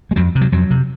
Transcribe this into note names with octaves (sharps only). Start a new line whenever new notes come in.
G#3
F2 F#3
C3
F#3
F2 F#3
C3